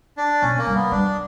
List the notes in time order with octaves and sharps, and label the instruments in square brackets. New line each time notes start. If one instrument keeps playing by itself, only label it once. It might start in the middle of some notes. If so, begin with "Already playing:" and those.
[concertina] D4
[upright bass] B2 [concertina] C#4
[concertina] A#3
[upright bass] G3
[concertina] B3
[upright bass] G3 [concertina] D4